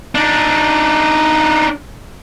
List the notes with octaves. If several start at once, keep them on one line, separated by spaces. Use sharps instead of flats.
D4 D#4